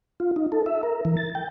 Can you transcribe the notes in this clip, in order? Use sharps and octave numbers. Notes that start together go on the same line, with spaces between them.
F4
D#4
A4
E5
A#4
E3
A6
G5